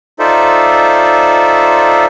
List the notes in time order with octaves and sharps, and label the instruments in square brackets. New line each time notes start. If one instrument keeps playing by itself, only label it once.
[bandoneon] D#4 F4 A4 C5 D5 E5